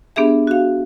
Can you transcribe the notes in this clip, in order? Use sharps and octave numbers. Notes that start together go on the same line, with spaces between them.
B3 D4 G4 G#4 E5
F#4 F5